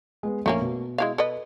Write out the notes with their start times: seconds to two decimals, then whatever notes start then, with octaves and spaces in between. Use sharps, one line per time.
0.23 G#3 B3
0.46 A#1 A3 A#3 C#4
0.62 B2
0.98 G#3 E4 F5
1.18 A4 B4 D#5